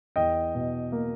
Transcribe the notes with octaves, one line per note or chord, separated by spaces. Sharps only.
E2 D#5 G5
B2
A#3